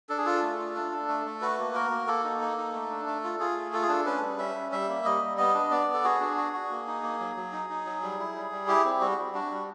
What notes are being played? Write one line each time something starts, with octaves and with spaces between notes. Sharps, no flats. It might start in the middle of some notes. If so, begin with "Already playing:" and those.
D4 A4
G#4
F4 A4
A3
F4
D4
D4
A3
A3
F#4 B4
A#3
F#4 A#4
A#3
A#3 A4
D#4
A#3
D#4
A3
D4
A3
F4
F4 G#4
A3
F4 A4
G#4
D4 A4
C#4 B4
G3
C#4 E5
G3
G3 E5
A#3
G3 D#5
G3
B3 D#5
D4
B3 D5
B3
A4
F#4 G#4
D4
F#4
F#4
A#3
D#4
A#3
F#3
F#3
D#4
D#4
F#3
G3
E4
G3
G3
E4 G4
C4
G3 F#4
G3
D4 F#4
G3